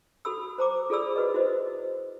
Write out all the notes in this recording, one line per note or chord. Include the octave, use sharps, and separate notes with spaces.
F#4 A4 B5 E6
C5 A#5 D6
F4 G#4 A4 D5 B5 E6
F#4 B4 D#5
E4 F#4 C5 D#5